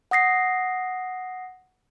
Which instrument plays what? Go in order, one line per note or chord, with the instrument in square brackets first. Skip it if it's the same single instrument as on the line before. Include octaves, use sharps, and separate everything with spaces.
[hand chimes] F#5 D#6 A#6 C7